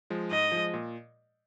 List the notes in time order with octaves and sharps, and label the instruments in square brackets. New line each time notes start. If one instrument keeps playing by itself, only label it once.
[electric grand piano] F3 G#3
[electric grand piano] G#2 [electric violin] D#5
[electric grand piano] F3 G#3
A#2